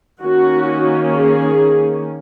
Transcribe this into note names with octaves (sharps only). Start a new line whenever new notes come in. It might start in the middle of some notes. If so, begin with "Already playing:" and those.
D#3 A#3 C#4 F#4
G#4